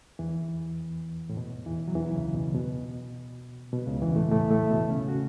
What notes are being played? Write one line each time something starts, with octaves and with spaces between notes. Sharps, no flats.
E2 E3
A2
B2
E2 E3
F#3
E2 E3
C#2 C#3
B2
B2
B2
C#2 C#3
E2 E3
A2 A3
A2 A3
A2 A3
B2 B3
C#3 C#4
F#4